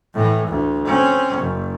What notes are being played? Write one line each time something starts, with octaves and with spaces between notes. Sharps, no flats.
A2 E3
D2
C4 C#4
F#1